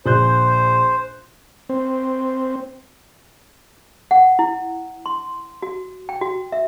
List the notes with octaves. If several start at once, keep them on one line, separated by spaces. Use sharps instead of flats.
A#1 C5 F#6 G6
C4
F#5
E4
C6
F#4
G5
F#4
E5